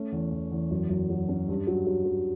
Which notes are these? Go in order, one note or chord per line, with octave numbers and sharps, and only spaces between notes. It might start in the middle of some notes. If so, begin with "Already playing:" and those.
Already playing: A3 C#4
E2
E2
E2
F#2
F#2
F#3
C#4
G2
F#3
F#3
F#3